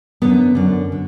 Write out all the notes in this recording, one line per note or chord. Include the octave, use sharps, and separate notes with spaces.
F#2 D3 B3
F#2 D3
D3